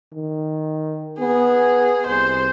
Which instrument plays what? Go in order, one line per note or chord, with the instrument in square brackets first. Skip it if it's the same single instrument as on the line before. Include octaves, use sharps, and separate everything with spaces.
[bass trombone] D#3
[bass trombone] B3 [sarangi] G#4
[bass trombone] C2 [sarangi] C5